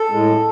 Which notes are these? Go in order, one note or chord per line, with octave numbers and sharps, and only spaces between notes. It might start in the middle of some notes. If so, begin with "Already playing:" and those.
Already playing: A4
A2 G#3